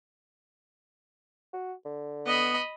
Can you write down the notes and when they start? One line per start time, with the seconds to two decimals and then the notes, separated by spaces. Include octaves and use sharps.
1.53 F#4
1.85 D3
2.26 B3 D#5 B5